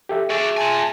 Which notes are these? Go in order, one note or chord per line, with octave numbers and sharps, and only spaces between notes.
G4 A4 E5
F#4 G#4 D5 E5
F4 G#5 A5